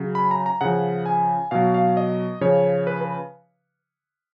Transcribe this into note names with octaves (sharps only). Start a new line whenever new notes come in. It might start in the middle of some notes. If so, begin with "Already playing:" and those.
Already playing: C#3 F#3
B5
A#5
A#5
C#3 F3 F#5
G#5
B2 F#3 F5
F5
D#5
C#3 F3 C#5
B4
B4